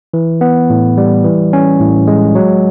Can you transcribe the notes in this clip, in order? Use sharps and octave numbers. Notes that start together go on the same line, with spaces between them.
E3
B3
A2
G3
E3
C#4
A2
G#3
F#3